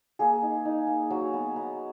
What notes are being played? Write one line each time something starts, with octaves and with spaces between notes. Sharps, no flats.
A#3 G#4
D#4
D#4
A#3
F#3
B3
B3